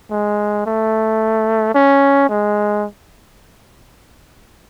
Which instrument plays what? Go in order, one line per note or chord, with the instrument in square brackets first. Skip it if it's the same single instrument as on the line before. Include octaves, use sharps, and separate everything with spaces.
[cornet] G#3
A3
C#4
G#3